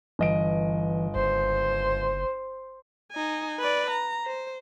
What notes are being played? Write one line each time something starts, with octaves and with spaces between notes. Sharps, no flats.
G1 E3 D#5 D7
F#1 C5
D#4 G#5
B4 D5
A#5
C5